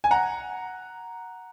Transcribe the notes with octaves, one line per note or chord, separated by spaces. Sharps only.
G#5
F#5 A#5